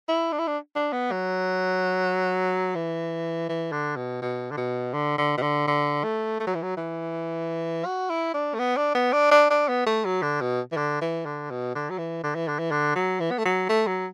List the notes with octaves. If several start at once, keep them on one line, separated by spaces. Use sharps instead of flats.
E4
D4
E4
D4
D4
B3
F#3
E3
E3
D3
B2
B2
D3
B2
D3
D3
B2
D3
D3
A3
A3
F#3
E3
F#3
E3
F#4
E4
D4
A3
B3
D4
B3
D4
D4
D4
B3
A3
F#3
D3
B2
E3
D3
E3
D3
B2
D3
F#3
E3
D3
E3
D3
E3
D3
F#3
E3
B3
A3
F#3
A3
F#3